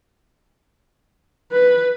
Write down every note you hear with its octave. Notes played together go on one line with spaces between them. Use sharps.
B4